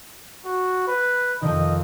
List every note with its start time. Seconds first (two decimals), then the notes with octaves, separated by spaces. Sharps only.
0.45 F#4
0.87 B4
1.42 F2 D#3 D#5